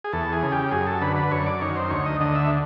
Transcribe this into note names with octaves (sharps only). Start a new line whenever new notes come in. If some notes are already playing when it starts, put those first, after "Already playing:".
G#4
E2 A4
G#4
C#3
G4
F#2 G#4
A4
D3 B4
B4
F#2 C#5
D5
D#3 C#5
C5
D2 C#5
D#5
D3 D#5
E5